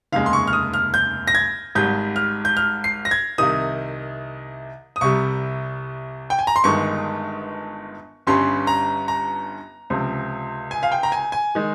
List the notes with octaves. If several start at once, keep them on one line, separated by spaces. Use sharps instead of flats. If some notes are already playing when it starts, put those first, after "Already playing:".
F1 D#2 C#3 G#3 F5
C6
C#6
F6
D#6
F6
G6
A#6
G#6
G#1 G#2 G3 G6
F6
G6
F6
C7
A#6
G#6
C2 C3 D#3 D#6
D#6
C2 C3 G3 C#6
G5
G#5
A#5
C6
G1 G2 D#3 G#3 C#6
G1 G2 G3 C#4 C6
A#5
A#5
C#2 C3 F3 C4
G#5
F5
G5
A#5
G#5
G#5
D#3 G#3